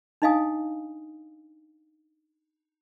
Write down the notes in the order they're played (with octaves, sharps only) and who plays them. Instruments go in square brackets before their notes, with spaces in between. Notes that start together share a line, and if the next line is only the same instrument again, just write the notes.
[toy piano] D4 D#4 D#5 F5 G#5 D#6